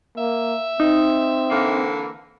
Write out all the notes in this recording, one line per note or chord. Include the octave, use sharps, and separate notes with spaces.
A#3 E5
C4 D#4
D3 E3 A#3